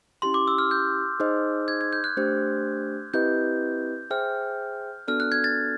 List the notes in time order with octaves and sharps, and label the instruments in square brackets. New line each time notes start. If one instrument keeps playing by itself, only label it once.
[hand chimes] C#4 E4 G4 [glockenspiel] C6
[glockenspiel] D6
E6
F6
G6
[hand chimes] D#4 G#4 C5 D#5
[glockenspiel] G#6
G#6
G6
F#6
[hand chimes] A3 D4 G4 C5
[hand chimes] C4 E4 G4 B4 D#5 [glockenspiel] G6
[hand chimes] G#4 C5 E5 G5 [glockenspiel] F6
[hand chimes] B3 D4 F#4 A4 D5 [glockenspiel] F6
[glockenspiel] F#6
G#6
A6